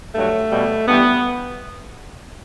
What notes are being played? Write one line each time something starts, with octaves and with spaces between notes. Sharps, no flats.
G2 F#3 A3
B2 G3
G2 E3 G3 B3